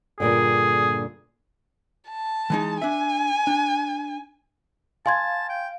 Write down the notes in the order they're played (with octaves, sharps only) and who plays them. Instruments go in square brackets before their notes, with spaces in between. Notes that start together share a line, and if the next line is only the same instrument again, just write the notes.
[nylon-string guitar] G2 A#2 D3 [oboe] G#4
[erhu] A5
[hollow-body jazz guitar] E3 G#3 D#4
[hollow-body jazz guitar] D4 E5 [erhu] G#5
[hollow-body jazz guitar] D4
[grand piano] F5 [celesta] G#5 C6 G#6 [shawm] A5
[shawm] G5